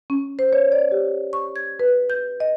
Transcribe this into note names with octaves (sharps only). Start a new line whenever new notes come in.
C#4
C5
C#5
D5
G4
C#6
G#6
B4
G6
D#5